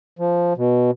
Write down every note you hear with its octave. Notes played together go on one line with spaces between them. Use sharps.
F3
B2